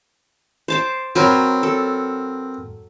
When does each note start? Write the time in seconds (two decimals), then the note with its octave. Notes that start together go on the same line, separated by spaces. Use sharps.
0.68 C5 A5 D6
1.16 F#3 C4 A#4 B4
1.63 A4